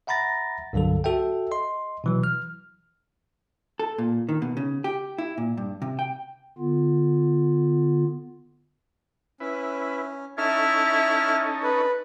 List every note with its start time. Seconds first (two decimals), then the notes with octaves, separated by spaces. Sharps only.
0.07 E5 F#5 A#5 B5 A6 A#6
0.73 C2 G2 D3 F#3 A4
1.04 F#4 A4 E5 G5
1.51 D#5 C6
2.04 B2 E3 F#3
2.24 F6
3.79 A4
3.98 A#2
4.29 D#3
4.42 B2
4.57 C#3
4.84 G4
5.18 E4
5.38 A#2
5.57 G2
5.82 C3
5.99 G5
6.58 D3 B3 F4
9.40 C#4 E4 B4
10.38 C#4 D#4 E4 A4 E5 F6
11.63 B4